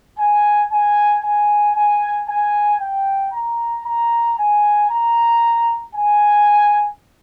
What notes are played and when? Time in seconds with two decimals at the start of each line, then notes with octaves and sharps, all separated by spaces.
0.18 G#5
0.70 G#5
1.23 G#5
1.75 G#5
2.28 G#5
2.80 G5
3.32 A#5
3.85 A#5
4.38 G#5
4.90 A#5
5.95 G#5